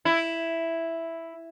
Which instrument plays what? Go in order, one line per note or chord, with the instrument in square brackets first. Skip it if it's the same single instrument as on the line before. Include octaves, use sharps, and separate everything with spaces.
[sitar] E4